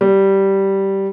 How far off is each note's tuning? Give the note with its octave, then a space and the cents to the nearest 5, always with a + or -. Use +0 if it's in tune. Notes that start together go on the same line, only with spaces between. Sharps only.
G3 -10